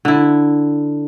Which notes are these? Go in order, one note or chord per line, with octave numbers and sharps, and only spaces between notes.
D3 E4